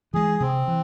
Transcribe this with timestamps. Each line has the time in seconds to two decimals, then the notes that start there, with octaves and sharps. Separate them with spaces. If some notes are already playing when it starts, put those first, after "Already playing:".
0.14 E3 G#3 G#4
0.40 C3 C4
0.68 E3